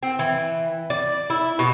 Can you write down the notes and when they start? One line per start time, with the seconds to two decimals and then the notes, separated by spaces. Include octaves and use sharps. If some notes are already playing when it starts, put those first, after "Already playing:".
0.03 C4
0.19 E3
0.90 D5
1.30 E4
1.59 B2